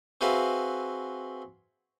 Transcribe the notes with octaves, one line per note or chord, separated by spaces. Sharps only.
C4 F#4 G#4 B4 E5 F5